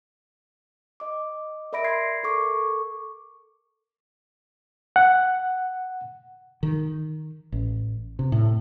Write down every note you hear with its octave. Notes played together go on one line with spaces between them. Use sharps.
D#5 D6
A#4 D5 E5 B5 A#6 D7
C6 G#6 C7
A4 A#4 C#6 D6
F#5
D#3
A1
C3
A2